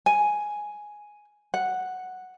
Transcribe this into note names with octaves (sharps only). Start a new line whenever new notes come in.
G#5
F#5